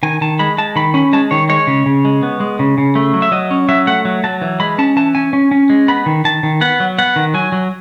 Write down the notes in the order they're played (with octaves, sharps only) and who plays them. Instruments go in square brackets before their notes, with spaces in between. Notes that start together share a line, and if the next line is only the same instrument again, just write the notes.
[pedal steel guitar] D#3 G#5
D#3 A5
G#3 B5
G#3 A5
D#3 B5
C#4 B5
G#3 A5
D#3 C#5
G#3 C#5
C#3
C#3
G#3
B3
G#3
C#3
C#3
A3
F#3
E5
F#3 D#5
C#4
F#3 E5
A3 F#5
F#3
F#3 A5
E3
G#3 B5
C#4 A5
E3 A5
C#4 G#5
C#4
C#4
G#3
B3 B5
D#3
D#3 A5
D#3
B3 F#5
F#3
B3 F#5
D#3
F#3 G#5
F#3